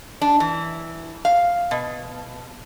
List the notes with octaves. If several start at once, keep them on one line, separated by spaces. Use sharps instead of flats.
D4
E3
F5
B2